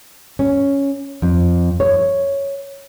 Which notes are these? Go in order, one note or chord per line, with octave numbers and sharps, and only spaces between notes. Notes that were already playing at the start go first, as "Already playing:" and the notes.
C#4
F2
C#5